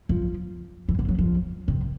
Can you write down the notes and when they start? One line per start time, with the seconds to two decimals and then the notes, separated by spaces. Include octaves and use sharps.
0.09 F3
0.88 E3
0.99 D3
1.09 F#3
1.19 F3
1.68 C3